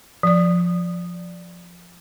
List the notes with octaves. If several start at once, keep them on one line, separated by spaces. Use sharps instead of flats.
F3 D5